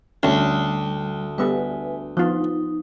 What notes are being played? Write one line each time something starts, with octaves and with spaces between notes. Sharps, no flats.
D2 G3 C#4 A5
G3 B3 A4 B4 E5 G#5
F3 B3 D#4 F4